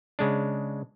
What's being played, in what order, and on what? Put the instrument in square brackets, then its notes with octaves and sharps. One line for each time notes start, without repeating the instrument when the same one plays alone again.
[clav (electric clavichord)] C#3 G#3 D4